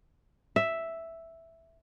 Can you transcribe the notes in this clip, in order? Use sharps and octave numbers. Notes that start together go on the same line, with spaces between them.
E5